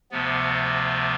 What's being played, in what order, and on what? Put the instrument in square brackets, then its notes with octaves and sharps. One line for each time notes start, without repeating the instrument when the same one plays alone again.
[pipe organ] D2 C3 F3 B3